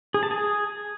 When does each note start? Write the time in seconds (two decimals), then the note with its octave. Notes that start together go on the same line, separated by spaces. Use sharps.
0.14 G#4
0.23 A5
0.31 G#4